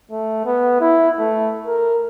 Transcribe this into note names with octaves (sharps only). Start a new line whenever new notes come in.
A3
B3
E4
A3
A#4